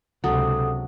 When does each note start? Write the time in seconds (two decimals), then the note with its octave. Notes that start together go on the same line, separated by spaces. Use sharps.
0.24 C#2 C3 F#3 D4 A4 F#5 D#6